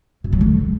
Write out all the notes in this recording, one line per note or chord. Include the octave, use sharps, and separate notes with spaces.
F#2
F#3
D3